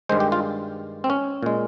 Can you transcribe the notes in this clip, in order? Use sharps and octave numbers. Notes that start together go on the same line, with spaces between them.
G2 D#3 G#3 C5
G4
F4
C4
C#4
A#2 G#3